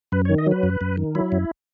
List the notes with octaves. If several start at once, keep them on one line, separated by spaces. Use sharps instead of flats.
F#2 B4
C#5
D#3
D#5
F#3 B4
F#2
F#2
D#3
F#3 E4
F#2